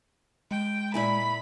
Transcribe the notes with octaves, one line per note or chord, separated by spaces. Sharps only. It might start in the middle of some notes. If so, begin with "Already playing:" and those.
G#3 G5
A#2 E4 G#5 B5